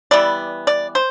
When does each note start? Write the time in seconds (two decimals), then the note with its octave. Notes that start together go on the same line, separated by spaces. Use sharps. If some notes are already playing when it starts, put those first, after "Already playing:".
0.11 E3 G3 B3 D5
0.67 D5
0.95 C5